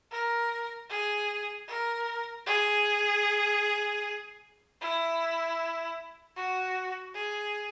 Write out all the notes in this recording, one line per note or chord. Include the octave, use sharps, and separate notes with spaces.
A#4
G#4
A#4
G#4
E4
F#4
G#4